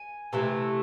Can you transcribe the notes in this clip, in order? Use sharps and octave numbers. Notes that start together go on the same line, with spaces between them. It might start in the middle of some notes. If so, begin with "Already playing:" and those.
Already playing: G#5
C3 E3 A3